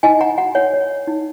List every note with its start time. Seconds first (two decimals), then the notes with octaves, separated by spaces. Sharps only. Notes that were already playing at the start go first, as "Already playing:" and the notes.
0.03 D#4 D#5 G#5
0.21 F#5 A#5
0.38 F#4 F#5 A#5
0.55 C#5 F#5
0.73 C#5
1.07 D#4